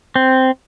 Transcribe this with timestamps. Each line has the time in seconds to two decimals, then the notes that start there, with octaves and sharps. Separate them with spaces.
0.16 C4